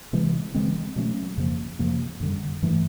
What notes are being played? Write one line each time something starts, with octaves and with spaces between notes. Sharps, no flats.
C3 E3 G#3
C#3 E3 G#3 C4
B2 F#3 A3 C#4
F2 C#3 F3 A#3
F2 C3 F3 A#3
F#2 D3 G3
G2 E3 A3